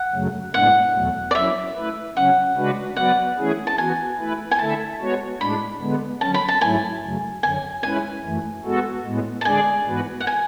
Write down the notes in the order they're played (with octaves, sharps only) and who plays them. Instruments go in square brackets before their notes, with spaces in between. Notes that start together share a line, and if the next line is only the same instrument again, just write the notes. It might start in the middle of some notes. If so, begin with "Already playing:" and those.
Already playing: [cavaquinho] F#5
[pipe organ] F#2 C#3 F#3 A3
[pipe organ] A2 G#3 B3 D4 [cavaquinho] F#5
[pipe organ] E2 B2 F#3 A3
[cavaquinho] D5
[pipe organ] F#3 C#4 E4 [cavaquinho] E5
[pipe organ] A3 E4 B4
[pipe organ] C#3 F#3 C#4 [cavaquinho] F#5
[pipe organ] C#3 G#3 D4 F#4 B4
[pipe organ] F#3 B3 F#4 B4 D5 [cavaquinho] F#5
[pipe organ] E3 A3 C#4 E4 G#4
[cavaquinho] A5
[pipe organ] E3 B3 F#4 [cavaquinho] G#5
[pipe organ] A3 E4 B4
[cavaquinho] G#5
[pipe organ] D3 A3 E4 A4 E5 [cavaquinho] A5
[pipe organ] G#3 B3 F#4 C#5
[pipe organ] A2 G#3 D4 [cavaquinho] B5
[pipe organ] D3 G#3 B3
[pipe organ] D3 F#3 C#4 [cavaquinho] A5
[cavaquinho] B5
A5
[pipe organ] G#2 F#3 A3 E4 [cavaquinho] G#5
[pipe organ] F#2 C#3 F#3 A3
[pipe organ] F#2 D3 F#3 [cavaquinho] G#5
[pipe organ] G#3 C#4 E4 B4 [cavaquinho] G#5
[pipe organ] F#2 E3 A3
G#3 B3 F#4 A4
A2 G#3 B3
[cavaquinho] A5
[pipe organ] D3 G#3 D4 G#4 D5 [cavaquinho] G#5
[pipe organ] G#2 E3 B3 F#4 B4
[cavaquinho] F#5
G#5